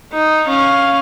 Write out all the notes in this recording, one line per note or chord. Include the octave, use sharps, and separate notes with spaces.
D#4
C#4 F5